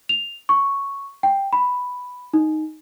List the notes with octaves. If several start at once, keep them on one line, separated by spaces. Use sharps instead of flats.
F7
C#6
G5
B5
D#4